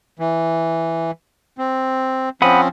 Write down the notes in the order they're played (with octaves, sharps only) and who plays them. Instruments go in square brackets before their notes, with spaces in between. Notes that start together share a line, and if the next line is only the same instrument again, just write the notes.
[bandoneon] E3
C4
[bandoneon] F3 C4 C#4 [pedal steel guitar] F#5 B5 D#6